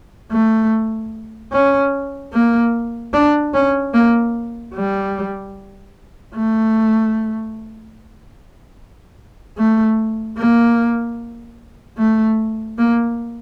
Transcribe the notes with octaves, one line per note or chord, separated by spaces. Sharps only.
A3
C#4
A#3
D4
C#4
A#3
G3
A3
A3
A#3
A3
A#3